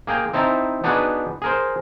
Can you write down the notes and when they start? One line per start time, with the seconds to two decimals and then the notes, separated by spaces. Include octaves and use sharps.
0.07 A#3 G#4 G5 A#5
0.33 C4 D#4 E4 A5 A#5
0.84 B3 D4 D#4 F#4 G#4 B4
1.42 G#4 A#4 C5